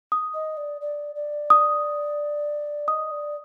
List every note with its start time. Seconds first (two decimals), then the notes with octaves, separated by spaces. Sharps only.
0.12 D#6
0.34 D#5
0.57 D5
0.81 D5
1.15 D5
1.50 D#6
2.88 D#5 D#6
3.11 D5